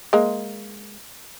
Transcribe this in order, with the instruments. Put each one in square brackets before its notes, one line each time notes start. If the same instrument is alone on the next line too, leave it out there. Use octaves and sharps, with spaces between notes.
[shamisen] G#3 A#3